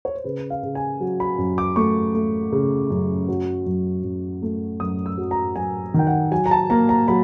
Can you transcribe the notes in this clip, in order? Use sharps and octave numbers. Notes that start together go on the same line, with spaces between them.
C#5
C5
C#3 B4
F5
C#3
G#5
F#3
B5
F#2
D6
A3 C#6
A3
C#3
F#2
F#3
F#2
F#2
A3
F#2 D#6
E6
F#3
A#5
F#3 G#5
D#3 G5
F#5
F#3 G#5
A#5
A5
A#3 A#5
A#5
F#3 B5